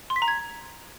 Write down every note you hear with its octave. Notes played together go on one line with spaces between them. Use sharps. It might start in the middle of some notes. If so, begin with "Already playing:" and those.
C6
B6
A#5
G#6